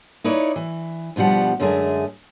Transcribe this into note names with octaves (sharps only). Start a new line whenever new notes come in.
D#4 E4 B4 C#5 D5
E3
D2 B2 F3 G3 F#5
F#2 D3 G#3 A3 G#4 E5